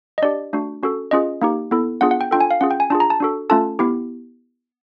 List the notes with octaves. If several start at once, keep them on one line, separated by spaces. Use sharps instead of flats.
D#5
D4 G4 D5
A3 D4 F#4
C#4 F#4 A4
C#4 F4 G#4 D#5
A#3 D#4 G4
B3 E4 A4
B3 D4 F4 G#4 F#5
F#5
G5
D4 F4 A4 G5
G#5
F5
C#4 F4 G#4 F#5
G5
G#5
D4 F4 G#4 A5
A#5
A5
D4 F#4 A4
A3 C#4 F4 A4 A5
B3 E4 G4